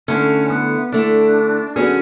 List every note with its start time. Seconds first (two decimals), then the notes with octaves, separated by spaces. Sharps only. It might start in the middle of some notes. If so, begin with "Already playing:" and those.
0.08 D3 A3 C#4 E4
0.50 B3
0.92 D3 A3 D4 E4
1.76 D3 F#3 B3 C#4 D4 G#4